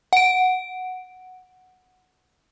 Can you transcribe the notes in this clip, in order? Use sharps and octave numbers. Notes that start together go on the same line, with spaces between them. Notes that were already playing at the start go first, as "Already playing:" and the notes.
F#5 D7